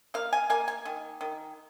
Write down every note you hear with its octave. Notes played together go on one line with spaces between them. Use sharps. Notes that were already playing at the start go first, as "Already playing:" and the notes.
A#3 F5
G#5
A#3 G#5
G#5
D#3
D#3